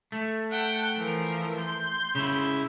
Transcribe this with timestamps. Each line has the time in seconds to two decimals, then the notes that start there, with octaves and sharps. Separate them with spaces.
0.12 A3
0.50 F#5 G5 A5
0.96 E3 F3 A#4
1.58 C6 G6
2.15 C#3 E4